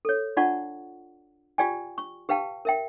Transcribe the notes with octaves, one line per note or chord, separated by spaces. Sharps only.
A4 C#5
D4 F4 D5 F#5 A5 C#6
F4 G4 D5 G5 G#5
C#6
G4 B4 F5 G5 A5
A#4 E5 G5